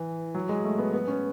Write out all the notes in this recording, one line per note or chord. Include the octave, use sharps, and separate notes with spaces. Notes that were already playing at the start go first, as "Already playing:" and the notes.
Already playing: E3
F#3
G#3
A3
B3
B3
C#4